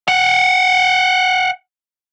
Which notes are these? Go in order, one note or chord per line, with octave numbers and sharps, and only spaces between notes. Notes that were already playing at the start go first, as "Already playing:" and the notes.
F5 F#5